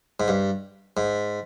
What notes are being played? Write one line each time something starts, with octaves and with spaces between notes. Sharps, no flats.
G#2
G2
G#2